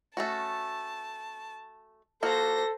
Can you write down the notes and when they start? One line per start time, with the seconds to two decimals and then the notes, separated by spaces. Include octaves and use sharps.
0.17 A3 C#4 F#4 A5
2.23 F3 A#3 F#4 A4 C5 A#6